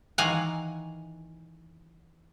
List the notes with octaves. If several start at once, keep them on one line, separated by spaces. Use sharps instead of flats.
D#3 E3 F5 F#5 G#5 A#5